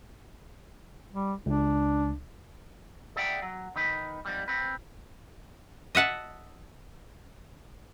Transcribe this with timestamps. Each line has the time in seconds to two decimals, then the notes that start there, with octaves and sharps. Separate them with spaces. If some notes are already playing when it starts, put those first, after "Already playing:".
1.11 G3
1.46 C#2 D4
3.16 G#4 D5 E5 F#5 G5
3.42 F#3
3.76 D#3 D#4 B4
4.25 F2 G#2 G3
4.48 C4 B4
5.95 D#5 E5 F#5 A5